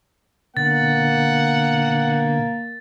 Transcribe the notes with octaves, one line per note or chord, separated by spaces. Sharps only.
B2 D3 A#3 F#5 A6